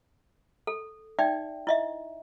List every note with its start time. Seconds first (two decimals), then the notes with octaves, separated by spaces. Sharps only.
0.67 A4
1.19 D#4 D5 E5 G5
1.67 E4 D#5 E5